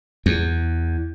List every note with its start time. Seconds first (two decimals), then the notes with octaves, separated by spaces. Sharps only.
0.26 E2